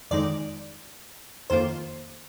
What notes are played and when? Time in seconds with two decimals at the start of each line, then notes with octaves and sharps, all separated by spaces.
0.11 F2 D#3 G#3 D#4 D5
1.50 F2 D#3 A#3 F4 C5